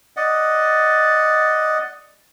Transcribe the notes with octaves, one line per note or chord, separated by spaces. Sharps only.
D5 D#5 F#5